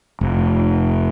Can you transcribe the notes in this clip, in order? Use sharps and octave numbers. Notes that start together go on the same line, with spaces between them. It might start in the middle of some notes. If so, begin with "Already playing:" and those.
F1